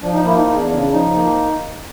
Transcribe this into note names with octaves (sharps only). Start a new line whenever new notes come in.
F3 D4
D#4
A#3 E4
D#4
E2 D#4
D4
C#3 D4
D4
F3 D#4
A#3